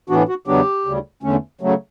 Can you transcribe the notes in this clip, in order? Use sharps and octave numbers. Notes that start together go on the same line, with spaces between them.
A2 E3 B3 D4 F#4
F#4
E2 C#3 F#3 B3 D4 G4
D2 C#3 G3
E2 D3 A3 C#4
C#3 F#3 A3